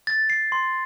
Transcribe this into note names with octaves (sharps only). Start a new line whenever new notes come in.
A6
C7
C6